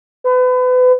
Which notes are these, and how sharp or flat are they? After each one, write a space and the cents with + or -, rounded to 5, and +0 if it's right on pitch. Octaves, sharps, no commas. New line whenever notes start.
B4 +35